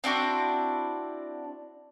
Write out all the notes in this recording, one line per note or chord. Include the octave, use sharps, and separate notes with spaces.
C4 D4 E4 F#4